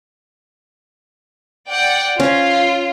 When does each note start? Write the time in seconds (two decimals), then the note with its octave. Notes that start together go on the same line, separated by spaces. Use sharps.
1.69 D5 F#5 G5
2.20 C#4 F4